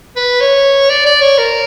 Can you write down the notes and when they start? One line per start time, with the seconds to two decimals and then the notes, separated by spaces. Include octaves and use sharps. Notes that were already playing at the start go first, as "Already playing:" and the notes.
0.16 B4
0.41 C#5
0.89 D5
1.06 D5
1.21 C#5
1.38 A#4